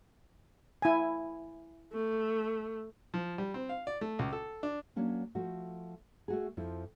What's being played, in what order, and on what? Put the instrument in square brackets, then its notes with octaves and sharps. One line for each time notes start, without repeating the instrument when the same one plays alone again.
[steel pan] E4 G#5
[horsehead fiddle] A3
[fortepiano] F3
G3
C4
F5
D5
A3
C#2
A4
D4
[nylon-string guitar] F#3 A#3 C#4 D4
F3 A3 F#4
A3 F#4 G#4
F2 F3 E4